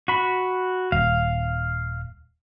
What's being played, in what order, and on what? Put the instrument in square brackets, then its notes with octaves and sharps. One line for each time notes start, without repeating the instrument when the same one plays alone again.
[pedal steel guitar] F#4 B5
[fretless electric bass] D#1 [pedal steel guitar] F5